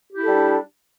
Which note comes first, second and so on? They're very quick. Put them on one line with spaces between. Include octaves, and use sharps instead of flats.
G4 E4 A4 G3 D4